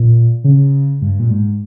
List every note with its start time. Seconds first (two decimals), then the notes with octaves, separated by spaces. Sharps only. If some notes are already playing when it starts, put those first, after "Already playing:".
Already playing: A#2
0.44 C#3
1.02 G2
1.19 A#2
1.30 G#2